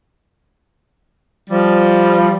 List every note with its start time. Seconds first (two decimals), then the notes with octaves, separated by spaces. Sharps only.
1.50 F3 G3